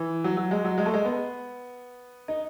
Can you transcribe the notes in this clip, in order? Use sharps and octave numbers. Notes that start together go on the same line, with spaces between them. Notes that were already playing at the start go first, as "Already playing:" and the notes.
Already playing: E3
F#3
F#3
G#3
F#3
G#3
A3
G#3
B3
D#4